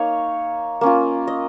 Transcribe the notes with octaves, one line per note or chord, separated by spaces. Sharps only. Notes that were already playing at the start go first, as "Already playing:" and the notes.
Already playing: A#3 D#4 C#5 F5
A#3 C#4 F4
D#5